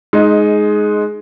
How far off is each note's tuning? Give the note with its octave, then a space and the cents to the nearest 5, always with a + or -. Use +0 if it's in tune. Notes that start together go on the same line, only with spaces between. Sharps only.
G#3 +15 D#4 +0